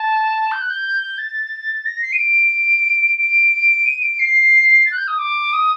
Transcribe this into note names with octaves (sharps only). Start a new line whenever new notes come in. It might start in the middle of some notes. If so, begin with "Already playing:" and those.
Already playing: A5
G6
F#6
G6
A6
A#6
C7
D#7
D7
D7
D#7
D7
C7
A6
F#6
G6
D#6
D6
D#6